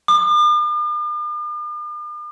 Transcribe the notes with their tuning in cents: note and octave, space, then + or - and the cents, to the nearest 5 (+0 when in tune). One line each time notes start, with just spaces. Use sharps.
D6 +45